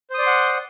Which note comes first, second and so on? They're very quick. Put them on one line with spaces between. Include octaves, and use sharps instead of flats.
C5 D#6 D5 C6 F#5